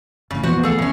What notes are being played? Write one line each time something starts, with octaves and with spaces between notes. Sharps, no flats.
F#1 F2 A2 C#3
E2 A#2 E3 F3 B3 F#4 C5
C#2 E3 A3 G#4 A4 F5
E1 F2 A2 D#3 C#4